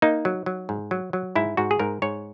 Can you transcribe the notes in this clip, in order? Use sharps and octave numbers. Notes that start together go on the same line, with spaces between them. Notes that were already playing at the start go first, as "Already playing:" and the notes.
A#3 D#4
F#3
F#3
G#2
F#3
F#3
G#2 E4
G#2 F#4
G#4
G#2 A#4
G#2 C#5